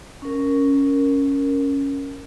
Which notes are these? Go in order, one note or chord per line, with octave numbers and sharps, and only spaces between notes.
C#4 A#4